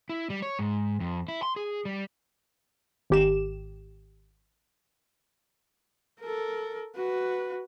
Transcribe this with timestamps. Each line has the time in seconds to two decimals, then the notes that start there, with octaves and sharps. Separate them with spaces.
0.09 E4
0.30 G3
0.42 C#5
0.59 G#2
1.00 F2
1.28 E4
1.43 C6
1.56 G#4
1.85 G3
3.10 G#1 G4 E7
6.21 A4 A#4
6.96 F#4 B4